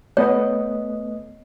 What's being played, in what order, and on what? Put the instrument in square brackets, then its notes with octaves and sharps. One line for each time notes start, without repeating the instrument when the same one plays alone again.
[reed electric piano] A3 B3 D#5 [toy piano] C#5